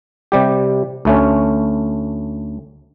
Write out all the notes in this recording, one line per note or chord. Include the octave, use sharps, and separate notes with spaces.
C3 G3 G4
D2 A3 C#4